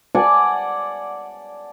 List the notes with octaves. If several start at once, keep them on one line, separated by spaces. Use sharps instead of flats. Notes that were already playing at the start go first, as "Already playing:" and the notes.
D5 F#5 G#5 A5